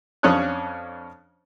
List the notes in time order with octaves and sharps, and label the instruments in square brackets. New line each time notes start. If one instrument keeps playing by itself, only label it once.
[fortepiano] F2 C#4 D4 C#5 D#6 F#6